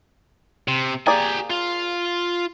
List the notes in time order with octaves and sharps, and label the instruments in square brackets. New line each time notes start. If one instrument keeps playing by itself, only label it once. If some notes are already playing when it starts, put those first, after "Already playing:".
[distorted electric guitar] C3
[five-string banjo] A#3 G#4 D5 [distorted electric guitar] G4 G#5
[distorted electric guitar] F4